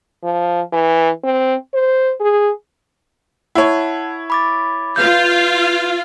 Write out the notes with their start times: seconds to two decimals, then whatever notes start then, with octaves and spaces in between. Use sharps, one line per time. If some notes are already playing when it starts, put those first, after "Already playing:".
0.24 F3
0.73 E3
1.24 C4
1.74 C5
2.20 G#4
3.55 E4 C#5 F#5 A5
4.30 B5 D6 A6
4.96 F4 B4 F5 G6